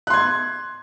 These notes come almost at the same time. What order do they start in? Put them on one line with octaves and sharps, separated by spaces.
F#6 C6 G#6